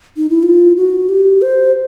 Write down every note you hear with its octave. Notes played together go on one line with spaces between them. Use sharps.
D#4
E4
F4
F#4
G4
C5